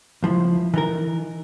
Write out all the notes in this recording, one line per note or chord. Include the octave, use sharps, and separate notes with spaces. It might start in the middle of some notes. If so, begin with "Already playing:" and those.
C#2 F3 E4
E3 D#4 A#4